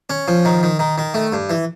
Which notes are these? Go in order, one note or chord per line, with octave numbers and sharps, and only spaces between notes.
C#4
F3
D#3
D#3
D#3
D#3
A3
G2
E3